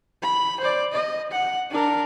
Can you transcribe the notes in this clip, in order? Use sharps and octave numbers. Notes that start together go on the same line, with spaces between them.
B5
C5 D5
D#5
F#5
D4 A#4